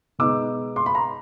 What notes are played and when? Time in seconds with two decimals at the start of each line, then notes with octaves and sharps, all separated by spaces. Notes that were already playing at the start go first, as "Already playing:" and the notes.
0.19 B2 G#3 B3 D#4 D6 E6
0.76 C6 D6
0.86 B5
0.95 A#5 C6